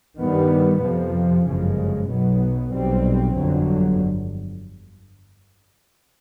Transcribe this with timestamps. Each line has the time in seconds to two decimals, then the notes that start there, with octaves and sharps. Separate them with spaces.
0.19 G2 D#3 G3 B3
0.83 F2 C3 F3
1.46 G1 F#2 C#3 F3 G#3
2.09 B1 B2 F#3 B3
2.72 B1 B2 G3 C4
3.36 G1 F2 D3 F#3